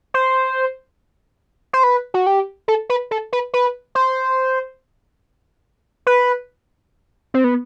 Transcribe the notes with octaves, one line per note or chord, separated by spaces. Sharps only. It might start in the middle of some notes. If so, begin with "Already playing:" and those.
C5
C5
B4
F#4
G4
A4
B4
A4
B4
B4
C5
B4
C4
B3